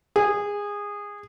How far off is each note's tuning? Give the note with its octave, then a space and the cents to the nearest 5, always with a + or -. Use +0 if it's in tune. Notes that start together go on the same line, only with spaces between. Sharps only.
G#4 -20